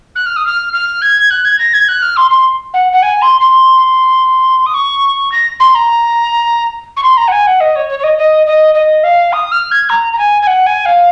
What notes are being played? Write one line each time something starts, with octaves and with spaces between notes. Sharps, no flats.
F#6
F6
D#6
F6
F6
G#6
F#6
G#6
A#6
G#6
F#6
F6
C6
C6
F#5
F#5
G#5
C6
C6
D#6
C#6
A#6
C6
A#5
C#6
C6
A#5
F#5
G#5
F#5
D#5
C#5
C#5
C#5
D#5
D#5
D#5
D#5
F5
D#6
F6
G#6
A#5
A#5
G#5
G#5
F#5
G#5
F5